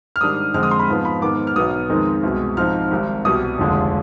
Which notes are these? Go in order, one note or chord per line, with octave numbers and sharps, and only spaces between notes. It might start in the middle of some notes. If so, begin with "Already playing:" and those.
F6
G#2 D#3 G3 D4 D#6
F2 D3 G#3 C4 F6
D#6
C6
B5
G#2 F3 B3
B5
G#2 D#3 B3 D6
F6
B1 B2 B3 D#4 D#6
F2 D#3 G#3 C4 D#4
C2 B2 G#3
G#2 F3 C4 D#4 F6
G#1 G#2 D#3 G3
C2 B2 G3 D#6
F1 D#2 D3 F3 G#3